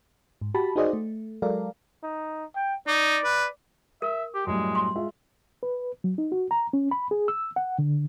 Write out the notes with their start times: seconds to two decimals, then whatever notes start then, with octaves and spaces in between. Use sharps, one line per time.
0.41 G#2
0.54 F#4 G4 A5 B5
0.76 D#4 F#4 G#4 C5 D5 D#5
0.93 A3
1.42 F#3 G#3 A4 A#4 D5 F5
2.03 D#4
2.55 G5
2.87 D#4 D5
3.24 B4
4.02 A#4 E5
4.34 G4
4.47 F#2 A2 G3 G#3
4.75 C6
4.96 G#3 F4 E5
5.63 B4
6.04 F#3
6.18 D#4
6.32 F#4
6.51 A#5
6.73 C#4
6.91 B5
7.11 G#4
7.28 E6
7.56 F#5
7.79 D3